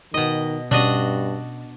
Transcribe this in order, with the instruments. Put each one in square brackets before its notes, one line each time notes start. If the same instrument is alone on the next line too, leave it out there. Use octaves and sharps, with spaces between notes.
[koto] B2 D#5 [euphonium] D#3
[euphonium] G2 [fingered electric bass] B2 C#4 [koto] D4 F#4 D#5